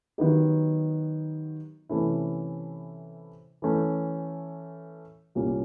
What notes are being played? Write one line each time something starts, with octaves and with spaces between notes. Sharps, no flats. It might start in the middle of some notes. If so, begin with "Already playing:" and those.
D#3 F#3 B3 D#4 G4
C3 E3 A3 C#4 E4
E3 A3 C#4
C2 A#2 G3 A#3 C#4